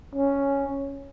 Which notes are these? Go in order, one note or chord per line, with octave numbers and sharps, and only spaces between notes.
C#4